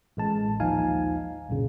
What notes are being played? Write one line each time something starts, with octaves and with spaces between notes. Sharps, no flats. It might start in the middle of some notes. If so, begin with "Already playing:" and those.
A1 G#3 A5
A#1 D#2 F3 D#4 F5 G#5
B1 F#2 A#2 C#3